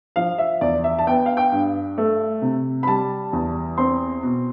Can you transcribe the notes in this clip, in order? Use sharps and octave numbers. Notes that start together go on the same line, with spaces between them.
F3 F5
E5
E2 D5
E5
A5
B3 G5
F5
G5
G2
A3
C3
B5
G3 A5
E2
C4 C6
B2